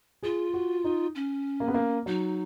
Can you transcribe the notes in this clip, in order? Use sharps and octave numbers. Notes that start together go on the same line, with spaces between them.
F4 G#4
F#4
D#4
C#4
A#3
B3
A#3
F#3 D#4